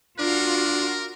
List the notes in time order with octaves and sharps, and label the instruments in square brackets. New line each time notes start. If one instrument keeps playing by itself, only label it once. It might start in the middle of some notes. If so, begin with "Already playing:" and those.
[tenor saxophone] D4 [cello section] F4 F#4 [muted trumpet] A#4